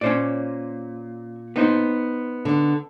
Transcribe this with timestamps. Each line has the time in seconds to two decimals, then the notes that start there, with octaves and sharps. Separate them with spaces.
0.01 A#2 C#4 C5 D5
1.56 B3 D#4 C5
2.45 D3